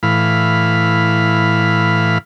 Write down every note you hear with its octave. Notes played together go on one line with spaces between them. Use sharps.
A2 E3 F5 B5